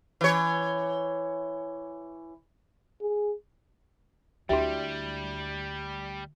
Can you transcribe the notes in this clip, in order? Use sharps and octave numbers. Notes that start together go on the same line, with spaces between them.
E3 C#5
G#4
D2 G3 D4 E4 F#4 G4 E5